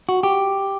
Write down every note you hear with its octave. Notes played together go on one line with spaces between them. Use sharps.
F#4
G4